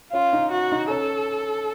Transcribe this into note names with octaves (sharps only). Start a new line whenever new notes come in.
C#4 F4
D#4
F#4
D#4
C#4 A4